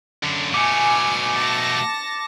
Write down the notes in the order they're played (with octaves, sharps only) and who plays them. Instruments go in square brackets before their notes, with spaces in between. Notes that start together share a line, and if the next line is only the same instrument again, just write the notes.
[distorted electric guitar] F#2 D3
[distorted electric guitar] B2 A3 [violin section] G#5 [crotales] D6 C#7
[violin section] A5 A#6